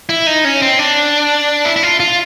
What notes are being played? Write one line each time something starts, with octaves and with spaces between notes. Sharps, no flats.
E4
D#4
C#4
C4
D4
E4
E4
F4
F4